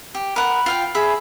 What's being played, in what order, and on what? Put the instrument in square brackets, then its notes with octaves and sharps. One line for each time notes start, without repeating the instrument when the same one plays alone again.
[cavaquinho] G4
[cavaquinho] A#4 F#5 [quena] B5
[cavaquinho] F4 F5 G5
[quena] G#4 [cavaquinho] E5 B5